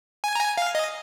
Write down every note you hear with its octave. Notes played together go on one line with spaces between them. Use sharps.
G#5
A#5
G#5
F5
D#5